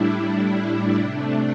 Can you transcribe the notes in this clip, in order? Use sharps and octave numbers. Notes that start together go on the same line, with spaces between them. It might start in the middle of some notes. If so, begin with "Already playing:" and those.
Already playing: A2 G3 D4 E4
D4
C3 A3 D4